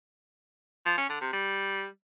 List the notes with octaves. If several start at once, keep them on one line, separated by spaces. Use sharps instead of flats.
F3
C#4
D3
C3
G3